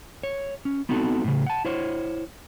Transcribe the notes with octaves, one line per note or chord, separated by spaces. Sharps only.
C#5
C#4
B3 C4 D#4 F#4 A4
A2 C#3
F#5 A5
E4 C5 C#5